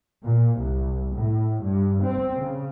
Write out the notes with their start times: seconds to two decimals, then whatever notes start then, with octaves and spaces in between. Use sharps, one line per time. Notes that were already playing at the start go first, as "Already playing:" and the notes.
0.24 A#2
0.58 C2
1.14 A2
1.63 G2
2.03 C4
2.35 C#3